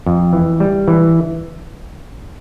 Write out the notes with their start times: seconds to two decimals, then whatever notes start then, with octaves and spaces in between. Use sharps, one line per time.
0.06 F2
0.33 E3
0.60 G3
0.88 E3